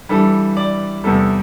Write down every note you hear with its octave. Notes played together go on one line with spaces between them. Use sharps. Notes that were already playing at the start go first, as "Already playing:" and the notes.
G2 E3 G3 A4
D5
E2 C3 G3 A4